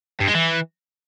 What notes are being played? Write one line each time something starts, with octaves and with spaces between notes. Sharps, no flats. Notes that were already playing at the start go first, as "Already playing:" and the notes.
G2
G#3
E3